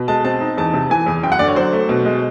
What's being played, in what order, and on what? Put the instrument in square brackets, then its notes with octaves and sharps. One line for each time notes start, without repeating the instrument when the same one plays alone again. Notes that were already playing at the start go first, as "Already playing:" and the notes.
Already playing: [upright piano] B2
G#3 A5
C4 A5
D#4
E2 A5
C3
E3 G#5
E2
F#2 G5
F#5
D3 D5
C#5
F#3 C5
A3
B2
G#3